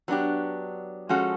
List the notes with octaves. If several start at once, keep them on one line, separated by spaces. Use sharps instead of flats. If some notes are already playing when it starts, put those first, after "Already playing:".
F#3 B3 D4 G4
F3 G#3 C#4 F#4 A4